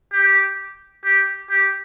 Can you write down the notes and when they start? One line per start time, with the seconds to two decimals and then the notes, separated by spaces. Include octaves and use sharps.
0.13 G4
1.05 G4
1.50 G4